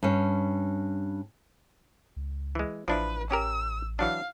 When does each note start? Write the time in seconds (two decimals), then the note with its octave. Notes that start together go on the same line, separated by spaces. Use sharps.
0.03 G2 C#4
2.16 C#2
2.55 E3 G#3
2.88 A1 F3 D4 E4 B4
3.31 C#4 G4 A#4 E6
3.99 E3 F#3 D4 F5